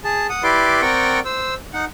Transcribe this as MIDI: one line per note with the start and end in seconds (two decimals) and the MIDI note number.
0.04 0.27 68
0.04 0.27 81
0.29 0.43 78
0.29 0.43 87
0.43 0.81 64
0.43 0.81 67
0.43 0.81 71
0.43 0.81 74
0.43 0.81 84
0.43 0.81 86
0.81 1.20 60
0.81 1.20 70
0.81 1.20 74
0.81 1.20 78
0.81 1.20 79
0.81 1.20 85
1.25 1.55 72
1.25 1.55 88
1.74 1.85 63
1.74 1.85 78